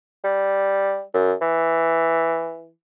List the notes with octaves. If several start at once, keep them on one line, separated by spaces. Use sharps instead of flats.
G3
F#2
E3